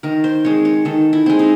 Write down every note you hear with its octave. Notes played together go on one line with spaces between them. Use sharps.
D#3 A#4
C5
G#3 C4 C#5
C#5
D#3 A4
E4
G#3 C4
D#4